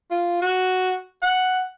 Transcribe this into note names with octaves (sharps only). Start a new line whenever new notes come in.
F4
F#4
F#5